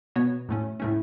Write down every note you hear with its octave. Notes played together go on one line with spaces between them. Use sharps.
B2 B3 F#4 C#5
A2 A3 C#4
A2 A3 C#4